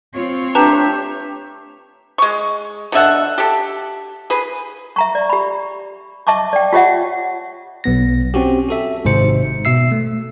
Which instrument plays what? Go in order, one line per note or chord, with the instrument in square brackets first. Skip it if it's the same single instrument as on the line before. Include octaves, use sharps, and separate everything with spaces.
[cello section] C4 F4 C#5
[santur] A3 G4 [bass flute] D4 [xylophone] B4 A5 A#5
[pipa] G#3 C#6
B2 D3 E5 F#5
G4 A4
G#4 B4
[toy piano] E5 A#5 C#6
D5
G4 B5
D#5 E5 A5 C#6 D6
D5 G5
F4 G4 C#5 D#5 E5 F#5
[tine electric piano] B1 B3 A#6
C4 C#4 F#4 G4
F#4 A4 E5
G#1 G#2 C3 C5 C#7
B2 E5 E6 C7
A3